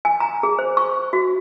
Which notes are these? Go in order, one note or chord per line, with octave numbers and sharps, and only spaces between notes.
G#5
A#5
G#4
C5
C#6
F#4